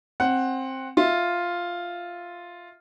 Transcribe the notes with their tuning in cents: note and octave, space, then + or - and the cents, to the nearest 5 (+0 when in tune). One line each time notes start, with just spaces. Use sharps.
C4 +15 F#5 +0
F4 +0 E5 +0